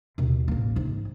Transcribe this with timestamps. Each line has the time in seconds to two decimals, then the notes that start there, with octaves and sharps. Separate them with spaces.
0.18 D#2 B2
0.48 A1 A#3
0.76 G#2